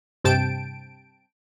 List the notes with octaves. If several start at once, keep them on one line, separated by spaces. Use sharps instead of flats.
G2 C3 G5 A5 D7